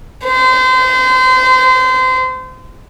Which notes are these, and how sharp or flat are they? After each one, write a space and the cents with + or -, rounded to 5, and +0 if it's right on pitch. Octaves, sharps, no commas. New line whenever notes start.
C5 -30